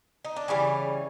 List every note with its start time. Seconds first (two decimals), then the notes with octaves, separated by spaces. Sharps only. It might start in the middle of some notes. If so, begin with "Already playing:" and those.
0.25 D#4
0.36 D4
0.48 C#3 E3 G3 C#4